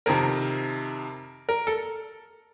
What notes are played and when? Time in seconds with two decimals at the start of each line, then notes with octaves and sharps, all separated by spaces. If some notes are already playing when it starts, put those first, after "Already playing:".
0.06 F2 C3 D#3 A#4
1.49 A#4
1.67 A4